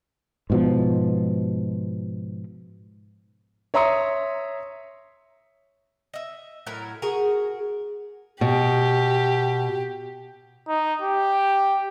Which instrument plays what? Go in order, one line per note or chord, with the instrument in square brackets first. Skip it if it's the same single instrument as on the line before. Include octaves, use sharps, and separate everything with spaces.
[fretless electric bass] G#2 B2 F3
[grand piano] C#5 E5 A#5 C6 D#6 C#7
[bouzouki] D#5 E5
A2 F#3 E4 A#4
F#4 G#4 A#4
[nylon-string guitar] B2 [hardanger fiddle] G4
[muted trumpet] D#4
G4